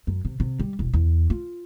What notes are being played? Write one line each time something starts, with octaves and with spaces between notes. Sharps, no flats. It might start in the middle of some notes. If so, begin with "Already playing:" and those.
F#2
C3
C3
G3
E1
E2
F4